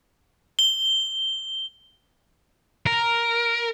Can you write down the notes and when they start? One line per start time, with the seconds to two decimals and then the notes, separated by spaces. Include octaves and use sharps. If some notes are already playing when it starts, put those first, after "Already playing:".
0.59 G7
2.87 A#4